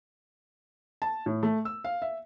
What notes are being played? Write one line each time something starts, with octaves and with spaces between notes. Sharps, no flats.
A5
A2
A3
E6
F5
E5